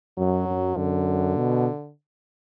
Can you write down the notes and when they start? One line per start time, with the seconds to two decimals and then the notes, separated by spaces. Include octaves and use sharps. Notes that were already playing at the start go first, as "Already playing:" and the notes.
0.18 F#2 F#3
0.47 F#2
0.77 F#2 D3
1.36 B2